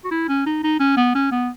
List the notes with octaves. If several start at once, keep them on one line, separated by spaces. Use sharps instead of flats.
F#4
E4
C#4
D#4
D#4
C#4
B3
C#4
B3